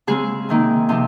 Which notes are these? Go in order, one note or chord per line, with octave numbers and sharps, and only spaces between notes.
C#3 G#3 C4 G#4
C3 D#3 A#3
C3 F3 C4